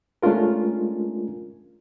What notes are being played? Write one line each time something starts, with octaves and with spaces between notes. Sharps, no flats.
G#3 A3 C#4 D4 F4 A#4